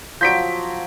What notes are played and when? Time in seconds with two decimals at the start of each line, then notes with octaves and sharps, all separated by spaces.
0.21 F3 F#3 G6 B6 D7